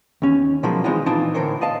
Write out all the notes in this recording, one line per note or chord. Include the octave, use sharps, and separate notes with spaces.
D#2 C#4
B2 F3 F#3 G#3 A#3
D#3 E3 G#3 C4 D#4 F4
A#2 E3 C4 D4 D#4 F4
A2 D3 F3 A#4 C5 C#5
D5 D#5 F5 A5